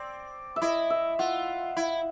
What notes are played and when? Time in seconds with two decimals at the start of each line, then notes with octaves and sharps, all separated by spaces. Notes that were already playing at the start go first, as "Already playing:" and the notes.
Already playing: C4 D5
0.56 E5
0.62 E4 D#5
0.90 E5
1.19 F4 F#5
1.77 E4